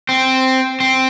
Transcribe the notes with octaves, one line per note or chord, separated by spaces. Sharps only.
C4
C4